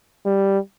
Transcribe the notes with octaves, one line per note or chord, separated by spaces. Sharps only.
G3